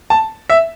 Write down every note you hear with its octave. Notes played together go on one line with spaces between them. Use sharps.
A5
E5